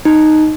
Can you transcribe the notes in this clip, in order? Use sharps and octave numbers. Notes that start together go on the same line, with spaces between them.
D#4